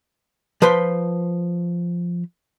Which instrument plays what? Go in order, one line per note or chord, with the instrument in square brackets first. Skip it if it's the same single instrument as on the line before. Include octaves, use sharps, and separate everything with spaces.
[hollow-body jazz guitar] F3 B4 C5 C6